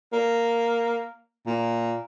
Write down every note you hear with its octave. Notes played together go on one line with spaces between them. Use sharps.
A#3
A#2